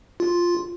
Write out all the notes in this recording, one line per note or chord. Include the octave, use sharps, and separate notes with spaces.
F4